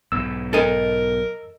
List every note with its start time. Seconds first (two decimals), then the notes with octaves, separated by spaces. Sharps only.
0.12 B1 G#2 E6
0.53 A4 A#4 D#5